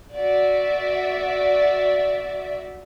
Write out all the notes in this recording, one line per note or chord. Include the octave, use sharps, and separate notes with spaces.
F#4 D5 E5